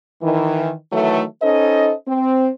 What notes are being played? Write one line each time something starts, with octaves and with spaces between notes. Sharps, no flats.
D#3 E3
D#3 E3 F#3 A3
C#4 D#4 A4 C5 D#5
C4